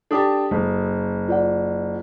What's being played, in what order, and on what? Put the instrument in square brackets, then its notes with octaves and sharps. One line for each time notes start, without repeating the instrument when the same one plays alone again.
[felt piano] D4 G4 A5 [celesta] A4 D#6
[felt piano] F#1
[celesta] F4 D5 F#5